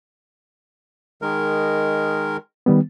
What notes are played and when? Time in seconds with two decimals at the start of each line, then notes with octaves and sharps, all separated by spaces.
1.22 D#3 G#3 A#4
2.66 D#3 G3 B3